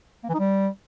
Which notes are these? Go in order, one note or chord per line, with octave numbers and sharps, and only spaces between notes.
A#3
E3
D#4
G3